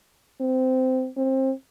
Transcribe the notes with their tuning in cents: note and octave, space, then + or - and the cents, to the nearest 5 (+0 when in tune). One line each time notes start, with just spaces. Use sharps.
C4 -20
C4 +25